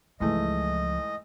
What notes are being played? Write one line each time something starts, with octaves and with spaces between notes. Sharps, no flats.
C#2 G#2 E3 F3 A3 D#5